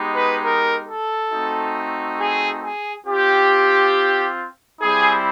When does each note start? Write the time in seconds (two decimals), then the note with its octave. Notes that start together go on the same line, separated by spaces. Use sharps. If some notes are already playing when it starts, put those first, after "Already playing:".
Already playing: G#3 B3 D#4 G4
0.13 B4
0.43 A#4
0.86 A4
1.30 A3 C4 D#4 F#4
2.18 G#4
2.62 G#4
3.05 C4 F4 G4
4.81 G3 C4 E4 G#4